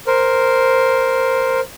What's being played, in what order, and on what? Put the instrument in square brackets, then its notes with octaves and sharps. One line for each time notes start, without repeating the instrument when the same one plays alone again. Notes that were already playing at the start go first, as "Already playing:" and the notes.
[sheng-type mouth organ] A#4 C5